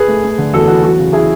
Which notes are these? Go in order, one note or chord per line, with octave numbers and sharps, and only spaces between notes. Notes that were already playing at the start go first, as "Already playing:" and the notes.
Already playing: G#4 B4
A3
A3
D3
E2 F#4 A4
E2 F#4
F#3 F#4
C#3
E4 G#4